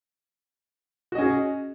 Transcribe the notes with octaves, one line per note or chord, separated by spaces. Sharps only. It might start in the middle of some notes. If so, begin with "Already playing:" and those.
C#4 F#4 G#4 D#5